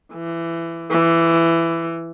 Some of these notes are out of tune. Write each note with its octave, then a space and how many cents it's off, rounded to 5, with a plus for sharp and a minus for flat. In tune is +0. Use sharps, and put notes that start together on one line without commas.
E3 +20
E3 +15